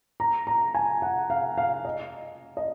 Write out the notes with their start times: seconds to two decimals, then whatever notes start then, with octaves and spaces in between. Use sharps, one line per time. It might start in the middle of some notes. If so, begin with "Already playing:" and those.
0.20 A#5
0.47 A#5
0.74 G#5
1.02 F#5
1.30 F5
1.57 F5
1.85 D#5
2.57 D#5